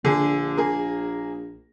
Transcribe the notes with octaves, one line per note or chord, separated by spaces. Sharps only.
A#1 D3 G#4
A#3 G#4